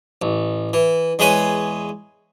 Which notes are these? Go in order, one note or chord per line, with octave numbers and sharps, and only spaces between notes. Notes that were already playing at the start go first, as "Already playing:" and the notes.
A1
E3
E2 G#3 G#4 B4 C#5 G#5